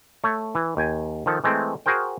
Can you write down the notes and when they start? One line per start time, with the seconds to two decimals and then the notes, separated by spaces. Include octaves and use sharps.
0.24 A3 C#5
0.55 E3
0.77 D#2 G5 G#5
1.26 D#3 F3 A4
1.44 E3 G#3 A3 C4
1.86 F#4 G#4 A#4 C5 G5